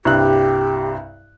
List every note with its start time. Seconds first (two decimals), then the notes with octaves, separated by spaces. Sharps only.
0.05 C2 G2 G4 F#6